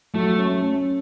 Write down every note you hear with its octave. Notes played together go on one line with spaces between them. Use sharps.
F#3 A3
C#4
C#4